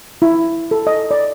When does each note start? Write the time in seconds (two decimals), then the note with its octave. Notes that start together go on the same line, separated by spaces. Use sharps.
0.22 E4
0.71 A4
0.87 D#5
1.11 D5